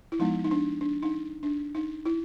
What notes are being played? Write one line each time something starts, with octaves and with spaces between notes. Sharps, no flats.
E4
F3 G#3 B3 D#4
D#4
D4
D4
D#4
D4
D#4
E4